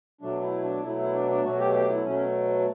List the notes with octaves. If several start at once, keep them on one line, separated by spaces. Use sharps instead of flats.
B2 F#3 A3 D4
E4
D4
B2 F#3 A3 E4
E4
D4
D4
B2 F#3 A3 F#4
G4
G4
E4
B2 F#3 A3 C#4